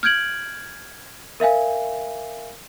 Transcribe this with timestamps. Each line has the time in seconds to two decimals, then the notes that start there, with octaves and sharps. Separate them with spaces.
0.03 F6 G6 G#6 D7 F#7
1.40 A#4 E5 F5 G#5